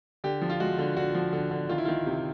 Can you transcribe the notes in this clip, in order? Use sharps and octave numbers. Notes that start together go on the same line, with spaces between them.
D3 G4
F3
F4
G#3 F#4
D3
D3 F#4
F3
D3
D3
D#3 F4
E4
D#3 F4
C3